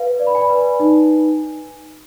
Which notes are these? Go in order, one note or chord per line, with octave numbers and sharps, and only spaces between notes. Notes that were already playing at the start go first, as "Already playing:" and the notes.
Already playing: B4 F5
D5
B5
G#5
B4
D#4